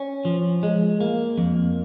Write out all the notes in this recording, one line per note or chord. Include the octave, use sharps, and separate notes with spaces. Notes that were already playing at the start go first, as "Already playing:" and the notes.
Already playing: C#4
F3
G#3
A#3
F2